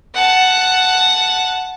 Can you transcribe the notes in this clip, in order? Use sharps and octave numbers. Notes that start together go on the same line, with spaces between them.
F#5 A5